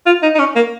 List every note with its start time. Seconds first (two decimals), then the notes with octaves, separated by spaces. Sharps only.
0.06 F4
0.22 D#4
0.35 D#4
0.39 C#4
0.56 A#3